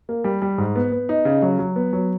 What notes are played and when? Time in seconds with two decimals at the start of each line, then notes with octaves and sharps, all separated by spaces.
0.09 A#3
0.24 G3
0.42 G3
0.58 G#2
0.76 B3
0.92 B3
1.09 D#4
1.25 C#3
1.42 F#3
1.59 F#3
1.76 B3
1.93 F#3